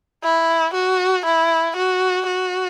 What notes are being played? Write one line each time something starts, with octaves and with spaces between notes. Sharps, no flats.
E4
F#4
E4
F#4
F#4